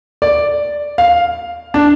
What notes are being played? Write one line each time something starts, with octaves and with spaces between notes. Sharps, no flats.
D5
F5
D4